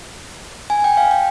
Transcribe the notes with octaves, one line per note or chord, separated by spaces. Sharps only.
G#5
G5
F5
G5